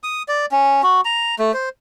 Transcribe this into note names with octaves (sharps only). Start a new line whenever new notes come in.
D#6
D5
C#4
F#4
A#5
A3
C5